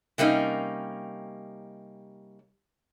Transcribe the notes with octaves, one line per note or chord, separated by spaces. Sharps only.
C3 G3 A#3 C#4 D#4